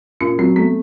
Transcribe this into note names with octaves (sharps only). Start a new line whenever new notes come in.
A#2 C#4
F#3 C4
A3 B3